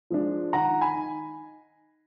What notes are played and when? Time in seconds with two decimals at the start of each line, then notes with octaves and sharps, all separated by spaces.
0.10 F3 G#3 D4
0.53 D#3 F#5 A#5
0.81 G#5 B5
0.95 D#4